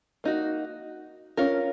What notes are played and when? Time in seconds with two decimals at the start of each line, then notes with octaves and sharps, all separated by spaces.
0.24 A#3 D#4 F#4
1.37 C#4 F4 A#4